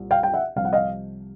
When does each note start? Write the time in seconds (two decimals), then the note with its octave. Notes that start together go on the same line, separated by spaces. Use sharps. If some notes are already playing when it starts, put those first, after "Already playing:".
Already playing: C2 A#2
0.11 F5 G5
0.23 G5
0.34 E5 F#5
0.56 C2 C3 F3 F5
0.65 F#5
0.73 D#5 F5